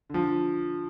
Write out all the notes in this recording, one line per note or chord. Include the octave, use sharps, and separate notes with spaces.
D3 F3